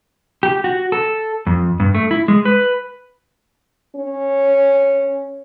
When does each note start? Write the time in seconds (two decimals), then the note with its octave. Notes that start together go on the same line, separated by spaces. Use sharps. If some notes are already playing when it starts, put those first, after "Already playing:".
0.43 G4
0.64 F#4
0.92 A4
1.47 F2
1.80 G2
1.95 A3
2.11 E4
2.28 G#3
2.45 B4
3.96 C#4